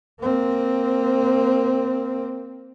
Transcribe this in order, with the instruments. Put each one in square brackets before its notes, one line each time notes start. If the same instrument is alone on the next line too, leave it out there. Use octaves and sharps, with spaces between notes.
[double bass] A#3 C4